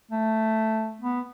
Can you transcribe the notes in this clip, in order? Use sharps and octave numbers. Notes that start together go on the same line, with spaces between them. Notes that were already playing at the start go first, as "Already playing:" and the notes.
A3
B3